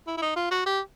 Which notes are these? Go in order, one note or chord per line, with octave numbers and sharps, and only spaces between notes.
E4
E4
D#4
F4
F#4
G4